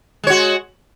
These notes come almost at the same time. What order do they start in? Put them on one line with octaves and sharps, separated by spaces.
G#3 C#5 F#4